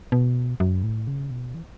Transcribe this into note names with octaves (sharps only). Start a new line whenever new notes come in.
B2
F#2
A2
C#3
B2
E3